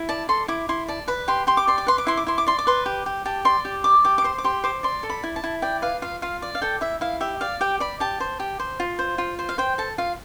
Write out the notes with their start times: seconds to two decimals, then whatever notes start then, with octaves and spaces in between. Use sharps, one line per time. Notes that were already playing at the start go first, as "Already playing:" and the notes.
Already playing: E4
0.09 D5 A5
0.29 A4 C6
0.48 E4 D6
0.69 E4 C6
0.88 D5 A5
1.08 B4 B5
1.28 G4 C6
1.47 G4 C6
1.57 D6
1.67 D5 C6
1.78 D6
1.87 B4 C6
1.98 D6
2.07 E4 C6
2.17 D6
2.27 E4 C6
2.38 D6
2.46 D5 C6
2.58 D6
2.67 B4 C6
2.86 G4
3.06 G4
3.25 G4 A5
3.45 D5 C6
3.65 G4
3.84 D5 D6
4.05 G4 D6
4.18 D6
4.24 C5 C6
4.38 D6
4.44 G4 C6
4.64 C5 D6
4.83 D5 C6
5.03 A4
5.10 B5
5.24 E4
5.36 A5
5.44 E4
5.62 D5 G5
5.82 B4 F5
6.02 F4 F5
6.22 F4 F5
6.42 D5
6.55 F5
6.62 A4 G5
6.81 E4 E5
7.01 E4 F5
7.21 G4 E5
7.41 D5 F5
7.61 G4 G5
7.80 D5 B5
8.00 G4 A5
8.20 C5
8.40 G4
8.59 C5
8.80 F4
8.99 C5
9.18 F4
9.39 C5
9.49 F5
9.58 C5 G5
9.78 A4 A5
9.98 F4 F5